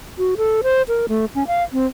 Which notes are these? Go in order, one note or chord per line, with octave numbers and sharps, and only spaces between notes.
F#4
A4
C5
A#4
A3
C#4
F5
C4